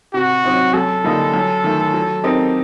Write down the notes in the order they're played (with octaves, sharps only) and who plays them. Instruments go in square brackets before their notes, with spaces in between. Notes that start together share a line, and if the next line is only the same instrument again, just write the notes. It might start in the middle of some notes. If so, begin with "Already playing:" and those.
[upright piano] C3 [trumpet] F#4
[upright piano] F#3 C4 D#4
[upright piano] F#2 [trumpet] A4
[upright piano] D3 G3 A#3 D#4
F#2
D#3 A3
F#3
C4 D#4 G4 A#4